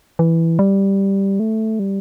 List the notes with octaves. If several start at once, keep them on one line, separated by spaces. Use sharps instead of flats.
E3
G3
A3
G3